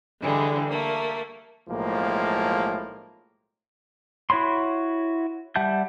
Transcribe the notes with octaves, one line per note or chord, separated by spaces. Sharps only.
D3 E3 G3 G#3
A3 A#3
B1 A2 F3 G#3 A#3
E4 F#4 C#5 B5 C6
G3 E5 F#5 A5 G6